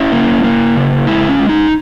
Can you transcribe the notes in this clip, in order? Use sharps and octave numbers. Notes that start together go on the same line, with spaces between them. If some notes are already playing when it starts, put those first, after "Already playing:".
Already playing: C#4 E4
A#3
A#3
C#3
G#3 E4
C#4
G#3
D#4